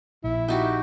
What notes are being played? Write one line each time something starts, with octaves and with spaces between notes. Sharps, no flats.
A#1 E4
D#4 F#4 G4